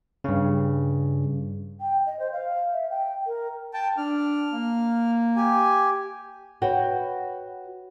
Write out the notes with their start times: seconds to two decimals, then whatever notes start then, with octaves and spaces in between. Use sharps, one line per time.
0.24 G2 C#3
1.81 G5
2.06 D#5
2.19 C5
2.32 F5
2.73 E5
2.90 G5
3.26 A#4
3.74 G5 A5
3.97 D4 F6
4.52 A#3
5.36 G4 G#5
6.62 F#4 B4 C#5 F#5 G5